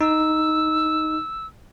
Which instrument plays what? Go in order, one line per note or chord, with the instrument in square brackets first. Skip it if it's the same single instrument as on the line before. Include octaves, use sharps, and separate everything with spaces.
[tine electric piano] D#4 [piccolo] E6